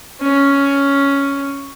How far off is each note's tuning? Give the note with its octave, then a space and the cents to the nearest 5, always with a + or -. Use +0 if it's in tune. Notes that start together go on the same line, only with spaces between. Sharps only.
C#4 +5